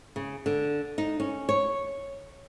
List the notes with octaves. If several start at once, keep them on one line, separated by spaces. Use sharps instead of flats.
C#3
D3
D#4
C#4
C#5